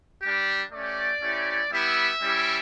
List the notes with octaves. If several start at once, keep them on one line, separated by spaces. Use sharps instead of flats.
G3 D4 G4
A3 C#4 G4 D5
A3 C#4 E4 G4
G3 B3 E4 G4 E5
G3 C#4 E4 G4